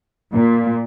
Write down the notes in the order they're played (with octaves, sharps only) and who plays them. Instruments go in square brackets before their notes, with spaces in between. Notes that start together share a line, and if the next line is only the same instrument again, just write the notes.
[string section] A#2